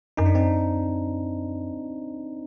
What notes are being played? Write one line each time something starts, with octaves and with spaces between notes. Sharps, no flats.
F#2 D#4
D4
C4 D#4